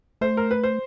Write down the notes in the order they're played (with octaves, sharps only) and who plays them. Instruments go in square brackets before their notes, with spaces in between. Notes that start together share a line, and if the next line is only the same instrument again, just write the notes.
[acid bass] A3 [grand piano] C5
[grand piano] A#4
B4
C5